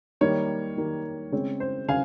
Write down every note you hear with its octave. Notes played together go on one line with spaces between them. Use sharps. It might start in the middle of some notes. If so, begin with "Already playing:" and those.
D#3 G3 A#3 C#5
D#3 G3 A#3
C#3 G#3 C4 C#5
C5
C#3 F5 G#5